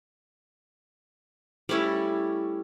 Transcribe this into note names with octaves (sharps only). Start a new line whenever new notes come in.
G3 A3 C#4 E4